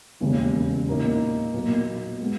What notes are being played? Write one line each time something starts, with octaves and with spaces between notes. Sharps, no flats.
E1 D#2 C#3
A#2 A#3 D#4
B1 A#2 A#3
G#3 B3